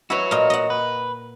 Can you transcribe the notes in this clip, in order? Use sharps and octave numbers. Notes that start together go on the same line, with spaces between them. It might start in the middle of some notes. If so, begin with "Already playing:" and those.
E4 F#4 B4 C#5
A#2 A#4 D#5
D#5 F#5
B4